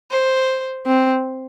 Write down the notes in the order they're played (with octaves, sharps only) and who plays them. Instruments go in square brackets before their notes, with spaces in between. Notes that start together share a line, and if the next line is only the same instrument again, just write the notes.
[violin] C5
[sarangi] C4